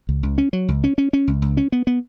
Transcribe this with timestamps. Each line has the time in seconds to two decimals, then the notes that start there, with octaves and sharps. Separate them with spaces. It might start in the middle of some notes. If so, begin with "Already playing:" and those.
0.09 C#2
0.23 C#2
0.38 C#4
0.53 F#3
0.68 C#2
0.84 C#4
0.98 C#4
1.13 C#4
1.28 C#2
1.42 C#2
1.57 C#4
1.72 B3
1.87 B3